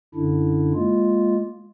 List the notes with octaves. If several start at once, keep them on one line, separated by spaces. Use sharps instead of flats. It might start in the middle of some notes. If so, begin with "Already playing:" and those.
F#2 D3 D4 E4
G#3 A#3 F4